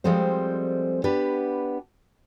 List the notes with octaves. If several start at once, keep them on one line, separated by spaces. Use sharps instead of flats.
F3 G3 G#3 C4 A4 C5
B3 D4 G4 B4